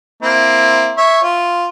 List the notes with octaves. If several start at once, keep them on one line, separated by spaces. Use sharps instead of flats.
A#3 C4 E4
C#5 E5
F4